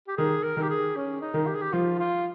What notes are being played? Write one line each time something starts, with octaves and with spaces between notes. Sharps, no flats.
G4
D#3 G#4
A#4
D#3
G4
G#4
C#4
D#4
D#3
G4
G#4
G4
F3 F4
F4